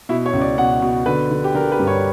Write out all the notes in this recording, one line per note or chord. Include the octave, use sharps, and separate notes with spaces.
B2 E4
C#5
C#2
D5
B2 F#5
B2
D3 B4
D3
G4
D3 A#4
B4
G2
C#5